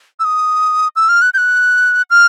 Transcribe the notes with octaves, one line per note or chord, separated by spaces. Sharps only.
E6
D#6
E6
F6
F#6
G6
F#6
F6